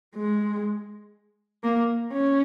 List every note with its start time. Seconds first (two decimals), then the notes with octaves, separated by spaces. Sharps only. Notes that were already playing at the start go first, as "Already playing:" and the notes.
0.16 G#3
1.64 A#3
2.13 C#4